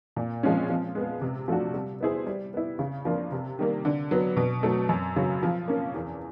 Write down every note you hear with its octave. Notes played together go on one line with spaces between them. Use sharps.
A#2
F3 G#3 C#4
F3
G#3 B3
C3
F3 A3 D4 F#4
G3
B3 E4 G#4 C5
G3
B3 E4
C#3
F3 A#3 D4 F4
C3
D#3 G3 A#3
D3
F#3 B3
B2
F#3 A3
F#2
C#3 F#3
F3
A#3 C#4
E2